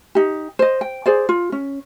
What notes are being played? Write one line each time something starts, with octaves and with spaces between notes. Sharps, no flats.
D#4 G4
C5 D#5
G5
G#4 C5 D5
F4
C#4